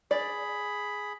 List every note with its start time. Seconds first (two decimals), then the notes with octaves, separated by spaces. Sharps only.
0.11 G#4 D5 B5